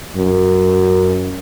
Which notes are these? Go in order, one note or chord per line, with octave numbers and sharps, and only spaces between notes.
F#2